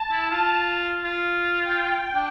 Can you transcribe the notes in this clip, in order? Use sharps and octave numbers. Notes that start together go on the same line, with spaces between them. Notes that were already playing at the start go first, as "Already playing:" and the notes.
Already playing: A5
E4
F4
F4
G5
D4